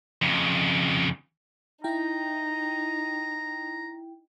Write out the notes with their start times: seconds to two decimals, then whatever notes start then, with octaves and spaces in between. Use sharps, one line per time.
0.22 F2 C#3
1.84 D#4 E4 G5 A#5